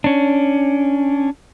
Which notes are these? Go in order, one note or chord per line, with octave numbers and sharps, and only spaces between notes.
C#4 D4